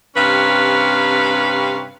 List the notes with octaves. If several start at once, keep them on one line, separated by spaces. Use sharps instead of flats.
G2 C3 C#4 B4 F5